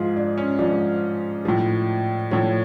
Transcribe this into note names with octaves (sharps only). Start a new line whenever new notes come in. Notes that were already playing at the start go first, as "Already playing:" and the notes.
Already playing: G#2 F3 F4 G#4
D4
C#4
G#2 F3 D4
A2 F3
A2 F3 C#5